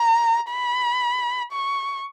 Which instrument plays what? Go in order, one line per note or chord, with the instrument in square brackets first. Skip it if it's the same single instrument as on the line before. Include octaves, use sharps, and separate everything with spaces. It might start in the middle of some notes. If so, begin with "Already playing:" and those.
Already playing: [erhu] A#5
B5
C#6